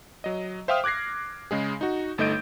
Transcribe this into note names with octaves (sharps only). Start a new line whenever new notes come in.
F#3 D#5
C5 E5 F5 G5 D#6 F6
D6 F#6 G#6 A#6 C7
C#3 G#3 G#4
D#4 F#4
G1 A3 D#4 D#5 G6 D7